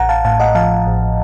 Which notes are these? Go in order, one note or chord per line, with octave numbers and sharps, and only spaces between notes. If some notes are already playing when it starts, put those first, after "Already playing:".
Already playing: A1 F#5 A#5
F5 A5
A2 F5 A5
D#5 F#5
F3 F5 A5
A1